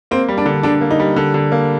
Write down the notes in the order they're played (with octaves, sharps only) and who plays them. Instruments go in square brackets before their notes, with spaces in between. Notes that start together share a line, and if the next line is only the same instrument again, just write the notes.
[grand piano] A#3 [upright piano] C4
[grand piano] G3
[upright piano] D4
[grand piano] D3
[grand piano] D3 [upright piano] D4
[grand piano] A#3
[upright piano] D#4
[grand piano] G3
D3
D3
A#3